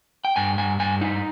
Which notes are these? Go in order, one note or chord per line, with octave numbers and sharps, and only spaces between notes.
G5
G2 G#5
G2 G#5
G2 G#5
D#4